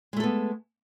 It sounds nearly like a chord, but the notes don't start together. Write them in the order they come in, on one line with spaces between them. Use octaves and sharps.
G#3 A3 A4 B3